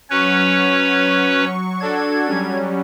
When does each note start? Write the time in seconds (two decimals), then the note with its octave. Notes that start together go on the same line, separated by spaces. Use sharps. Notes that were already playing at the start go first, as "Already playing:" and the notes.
0.10 F#3 C#4 B4 C#5 C#6
1.80 D4 F#4 A4 G#6
2.26 F#3 G3 C#4